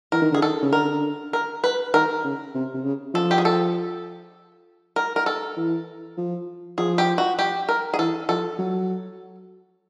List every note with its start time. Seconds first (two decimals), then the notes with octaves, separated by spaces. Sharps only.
0.12 E3 A#4
0.22 D#3
0.32 D3 G#4
0.41 D#3 A4
0.62 C#3
0.73 D3 A#4
1.33 A#4
1.64 B4
1.94 D#3 A#4
2.24 C#3
2.55 C3
2.74 C3
2.84 C#3
3.14 F3 A4
3.31 G4
3.38 G#4
3.45 A4
4.96 A#4
5.16 A#4
5.26 A4
5.57 E3
6.18 F3
6.78 F3 G#4
6.98 G4
7.18 F#4
7.39 G4
7.69 A#4
7.94 G#4
7.99 E3 A4
8.29 F3 A4
8.59 F#3